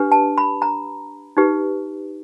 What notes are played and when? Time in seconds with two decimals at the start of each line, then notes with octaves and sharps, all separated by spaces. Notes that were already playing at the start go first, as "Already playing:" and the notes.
Already playing: D4 G4 B4
0.12 A5
0.38 B5
0.62 A#5
1.37 D#4 G4 B4